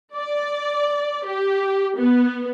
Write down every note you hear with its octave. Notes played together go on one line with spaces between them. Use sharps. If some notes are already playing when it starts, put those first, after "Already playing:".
D5
G4
B3